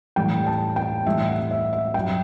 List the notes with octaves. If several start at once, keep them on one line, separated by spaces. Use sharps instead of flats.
A2 E3 G3 G5
A5
G5
A2 E3 G3 E5
F#5
E5
E5
G2 F#3 G5